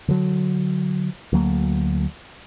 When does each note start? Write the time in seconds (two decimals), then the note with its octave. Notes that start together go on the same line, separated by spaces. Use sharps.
0.08 D3 F#3
1.33 D2 F#3 A#3